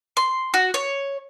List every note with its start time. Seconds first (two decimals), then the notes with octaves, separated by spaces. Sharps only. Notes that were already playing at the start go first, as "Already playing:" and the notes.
0.17 C6
0.54 F#4
0.74 C#5